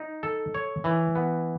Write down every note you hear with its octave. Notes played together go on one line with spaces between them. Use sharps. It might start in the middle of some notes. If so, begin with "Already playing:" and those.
Already playing: D#4
A4
C#5
E3
B3